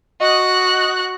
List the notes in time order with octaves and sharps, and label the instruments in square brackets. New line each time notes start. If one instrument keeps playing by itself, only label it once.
[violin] F#4 F#6 [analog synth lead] D#5